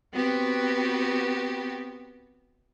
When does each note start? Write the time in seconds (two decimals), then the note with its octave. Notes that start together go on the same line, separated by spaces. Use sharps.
0.12 B3 C4 F#4 G4 B4